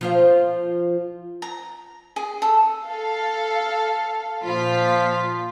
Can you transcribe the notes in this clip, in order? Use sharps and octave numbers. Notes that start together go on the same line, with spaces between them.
F3 F4 C5
A#5
G#4
A4
A4 F5
A#2 F3 F4 B6